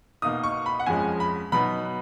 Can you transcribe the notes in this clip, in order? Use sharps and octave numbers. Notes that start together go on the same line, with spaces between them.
B2 A#3 D#4 D#6
C#6
B5
F#5
F2 F3 G#3 C#4 G#5
B5
B2 F#3 B3 D#4 B5